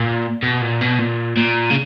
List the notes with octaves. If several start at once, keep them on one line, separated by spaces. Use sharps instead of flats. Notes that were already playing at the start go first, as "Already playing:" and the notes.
Already playing: A#2
B2
A#2
B2
A#2
A#2
C#3